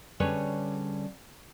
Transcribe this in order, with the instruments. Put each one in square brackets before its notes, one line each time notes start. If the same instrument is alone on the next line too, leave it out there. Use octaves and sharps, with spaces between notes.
[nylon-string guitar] D3 G3 C#4 G#4 B4 C#5